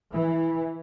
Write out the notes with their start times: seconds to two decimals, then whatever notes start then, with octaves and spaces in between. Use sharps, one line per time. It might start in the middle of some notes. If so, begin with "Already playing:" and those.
0.13 E3